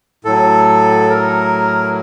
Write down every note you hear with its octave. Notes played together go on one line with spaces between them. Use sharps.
A2 F#3 A4
A#4